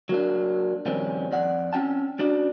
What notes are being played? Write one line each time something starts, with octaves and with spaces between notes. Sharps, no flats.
F#3 A#3 D4
F2 A#2 D#3 G3 C4 C#4
F2 D5 F#5
C4 C#4 D#4 G5 A5
C#4 D4 F#4 D5